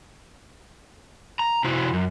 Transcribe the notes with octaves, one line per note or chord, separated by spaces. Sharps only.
A#5
C3 E4 F#4 C5
F#2